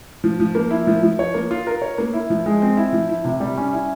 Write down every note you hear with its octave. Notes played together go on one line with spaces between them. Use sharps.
F3
F3
A#3
E4
F3
F3
C#5
A#3
F4
A#4
C#5
A#3
E4
F3
G#3
C4
E4
F3
E4
C3
G3
C#4
E4